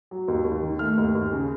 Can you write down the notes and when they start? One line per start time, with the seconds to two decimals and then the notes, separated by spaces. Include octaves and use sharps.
0.11 F#3
0.28 D#2
0.45 D#2
0.63 D#3
0.79 A3 F6
0.98 D#2
1.15 D#2
1.32 C#3